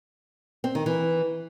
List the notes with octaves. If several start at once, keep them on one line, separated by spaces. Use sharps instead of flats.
C4
D#3
E3